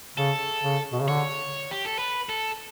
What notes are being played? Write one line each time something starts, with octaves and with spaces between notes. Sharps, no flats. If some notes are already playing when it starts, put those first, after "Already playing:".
C#3 A4
C#3
B2
C#3
D3 C#5
G4
A4
B4
A4